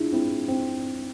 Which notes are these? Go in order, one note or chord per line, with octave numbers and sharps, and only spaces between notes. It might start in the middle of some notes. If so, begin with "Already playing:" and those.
Already playing: D4 E4 F4 G#4
C4 E4
C4